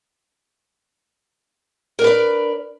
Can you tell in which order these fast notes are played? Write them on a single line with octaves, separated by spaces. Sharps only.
A#4 D4 B4 D5